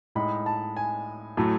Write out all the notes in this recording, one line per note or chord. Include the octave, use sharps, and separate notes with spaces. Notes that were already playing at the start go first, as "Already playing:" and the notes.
A2 G#3 D#4 B5
A5
G#5
A2 F#3 A3